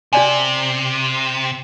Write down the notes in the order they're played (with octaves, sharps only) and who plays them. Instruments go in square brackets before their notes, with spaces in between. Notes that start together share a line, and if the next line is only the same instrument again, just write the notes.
[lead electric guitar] C3 [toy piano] E4 D5 G#5